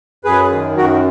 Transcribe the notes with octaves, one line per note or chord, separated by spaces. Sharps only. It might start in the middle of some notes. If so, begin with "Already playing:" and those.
F#2 G#4 B4
D#3
F#2 F#4 A#4